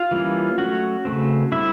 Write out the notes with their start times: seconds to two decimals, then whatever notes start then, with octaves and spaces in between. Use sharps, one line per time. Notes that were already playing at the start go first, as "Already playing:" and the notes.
Already playing: F4 F5
0.11 E3 G3 A#3 C#4
0.58 F#3 A3 C#4 F#4 F#5
1.05 C#3 F3 A3 C4
1.52 D3 G3 C4 E4 E5